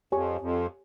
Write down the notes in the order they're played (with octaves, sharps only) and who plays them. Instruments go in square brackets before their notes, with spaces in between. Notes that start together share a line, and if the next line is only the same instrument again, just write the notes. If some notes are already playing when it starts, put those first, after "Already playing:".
[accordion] F2 [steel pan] G4 C#5 G#5 C#6
[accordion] F2